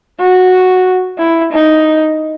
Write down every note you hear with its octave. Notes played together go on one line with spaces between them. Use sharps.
F#4
E4
D#4